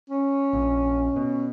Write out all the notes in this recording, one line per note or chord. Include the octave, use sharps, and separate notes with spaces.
C#4
A#1
B2